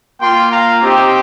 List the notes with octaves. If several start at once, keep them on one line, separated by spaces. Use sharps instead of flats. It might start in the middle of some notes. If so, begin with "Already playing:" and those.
A#3 F4 G5 C6
F5 A#5
C4 D#4 G4